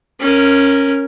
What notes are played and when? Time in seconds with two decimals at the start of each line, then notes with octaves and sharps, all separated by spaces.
0.20 C#4 A#4